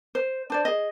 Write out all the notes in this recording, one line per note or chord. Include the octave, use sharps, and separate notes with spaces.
C5
D4 C5 D5
G#4 D#5